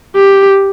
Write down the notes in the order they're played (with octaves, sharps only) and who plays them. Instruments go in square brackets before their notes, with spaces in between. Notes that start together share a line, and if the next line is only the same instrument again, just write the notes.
[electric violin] G4